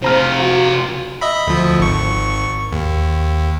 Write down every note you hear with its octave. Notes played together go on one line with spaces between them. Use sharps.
C3 F4 C5 A#5 F6
F#4
D#5 E5 B5
D2 F3
G#1 C#6
D#2